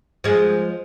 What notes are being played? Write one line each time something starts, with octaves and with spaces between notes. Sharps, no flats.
F3 G#3